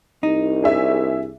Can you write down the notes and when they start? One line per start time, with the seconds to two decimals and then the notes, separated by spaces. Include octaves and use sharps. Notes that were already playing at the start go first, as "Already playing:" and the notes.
0.23 C2 D#4
0.62 D4 G#4 E5